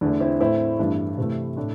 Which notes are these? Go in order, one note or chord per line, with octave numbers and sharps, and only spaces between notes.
E2 D3 A3 D4
C4 E4
A2 A3 C4 E4
G2 E3 A3 D4
C3 E3 A3
A2 A3 D4